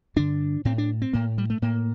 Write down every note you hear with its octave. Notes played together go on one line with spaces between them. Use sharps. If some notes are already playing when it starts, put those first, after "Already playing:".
G2 D3 D4
A2 C4
D4
C4
A2 A#3
G3
A3
A2 A#3